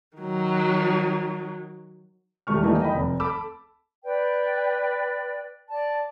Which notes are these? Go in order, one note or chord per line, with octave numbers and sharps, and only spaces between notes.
D#3 F#3
E1 G3 A3 C#6 F6
E3 G3 A3 A#3 D#4 E4
D#5 G5 B5
F1
A4 B5 D6 E6
B4 D5 G5
D5 A5